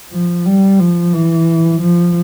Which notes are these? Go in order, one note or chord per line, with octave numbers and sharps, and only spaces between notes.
F3
G3
F3
E3
F3